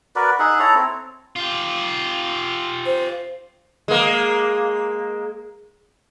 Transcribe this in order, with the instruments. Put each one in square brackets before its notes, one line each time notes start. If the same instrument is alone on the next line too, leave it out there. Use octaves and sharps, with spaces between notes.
[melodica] F#4 A#4 B4 D5
D#4 G#4 E5 F#5
E4 A4 C#5 A#5
C4
[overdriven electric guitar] F4 G4
[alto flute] C5
[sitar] G#3 A#3